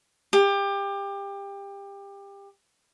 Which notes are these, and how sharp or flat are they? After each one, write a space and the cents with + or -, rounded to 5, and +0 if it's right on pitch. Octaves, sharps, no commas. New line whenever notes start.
G4 +25